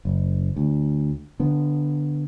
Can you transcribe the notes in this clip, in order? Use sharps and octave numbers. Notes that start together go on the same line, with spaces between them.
F#1
D2
D3 B3